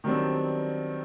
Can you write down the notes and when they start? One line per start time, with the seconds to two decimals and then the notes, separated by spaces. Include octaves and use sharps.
0.04 D#3 F#3 G3 B3 C4 D4